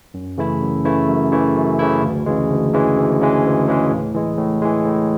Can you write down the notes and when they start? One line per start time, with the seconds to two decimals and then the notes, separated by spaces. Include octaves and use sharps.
0.14 F#2
0.38 C#3 E3 A3 E4
0.62 F#2
0.85 C#3 E3 A3 E4
1.09 F#2
1.32 C#3 E3 A3 E4
1.56 F#2
1.79 C#3 E3 A3 E4
2.02 D2
2.26 C#3 E3 G#3
2.50 D2
2.74 C#3 E3 G#3
2.97 D2
3.21 C#3 E3 G#3
3.44 D2
3.68 C#3 E3 G#3
3.91 A2
4.15 E3 G#3
4.38 A2
4.62 E3 G#3
4.85 A2